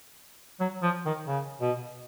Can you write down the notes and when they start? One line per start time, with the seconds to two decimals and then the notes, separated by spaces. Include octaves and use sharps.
0.60 F#3
0.83 F3
1.06 D#3
1.28 C#3
1.61 B2